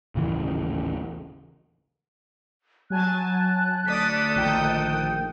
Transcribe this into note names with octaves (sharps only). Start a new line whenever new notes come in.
D#1 A1 C#3 E3
F#3 G#5 A5 F#6
D2 A4 D5 D#6 A6 B6
A#1 D#3 G5